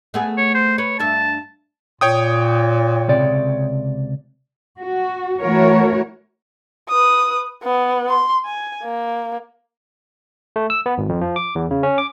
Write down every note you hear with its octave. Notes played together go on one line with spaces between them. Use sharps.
A3 B3 G#4
C#5
C5
B4 C#5
G2 E5 A5
A#2 C#5 G5 D#6
C#2 C3 D5
F#4
E3 A3 F#4 A#4 C#5
B4 D#6
B3
C6
G#5
A#3
A3
E6
B3
G#1
F2
F3
D6
E2
C#3
C#4
D6